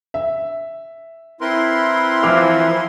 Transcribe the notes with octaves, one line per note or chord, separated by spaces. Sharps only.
E5
C4 E4 A#4 B4 C6
E3 F3 E5 D6 F6